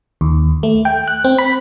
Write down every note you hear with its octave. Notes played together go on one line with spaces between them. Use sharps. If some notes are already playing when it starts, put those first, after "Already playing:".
D#2
A3
G5
F#6
C4
B5